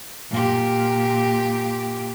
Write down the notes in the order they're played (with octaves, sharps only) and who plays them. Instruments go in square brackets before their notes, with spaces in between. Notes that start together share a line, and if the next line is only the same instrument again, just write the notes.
[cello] A#2 G4